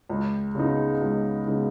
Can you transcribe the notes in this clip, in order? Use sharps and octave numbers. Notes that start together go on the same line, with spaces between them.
C#2
C#3 G#3 B3 D#4
C#2
C#3 G#3 B3 D#4